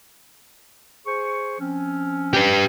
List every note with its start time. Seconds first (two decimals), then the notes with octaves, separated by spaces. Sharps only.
1.06 G#4 C5 C#6
1.59 F3 C4 C#4
2.33 G4 B4